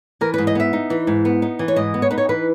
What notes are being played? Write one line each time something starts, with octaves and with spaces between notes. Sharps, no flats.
E3 A#4
G#2 B4
D#5
B3 E5
D#4
E3
G#2
B3
D#4
E3
C#5
G#2 D#5
B3
C#5
D#4 B4
C#5
E3 B4